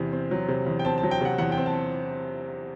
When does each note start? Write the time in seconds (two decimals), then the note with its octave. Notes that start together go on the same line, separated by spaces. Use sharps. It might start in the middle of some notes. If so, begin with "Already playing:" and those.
Already playing: E2 C3
0.12 C4
0.31 F#3
0.48 C3
0.67 E2
0.79 G5
0.85 C4 A5
0.98 A5
1.03 F#3
1.11 G5
1.21 C3 F#5
1.38 E2 F#5
1.52 G5
1.57 C4
1.66 A5